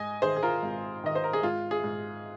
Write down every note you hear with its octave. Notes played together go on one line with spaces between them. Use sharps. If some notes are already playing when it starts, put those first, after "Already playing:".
Already playing: G#2 D#5 G#5
D#3 G#4 C5
G#4
F4 A#4
G#1
D#3 D#5
C5
A#4
G#4
G#2 F4
G#4
G#2